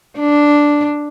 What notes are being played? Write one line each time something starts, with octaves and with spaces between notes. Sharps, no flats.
D4